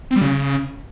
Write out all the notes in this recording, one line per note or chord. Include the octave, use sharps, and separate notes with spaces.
C4
G3
C#3